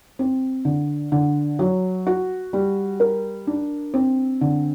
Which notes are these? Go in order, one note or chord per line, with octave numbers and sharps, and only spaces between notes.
C4
D3
D3
F#3
F#4
G3
A#4
D4
C4
D3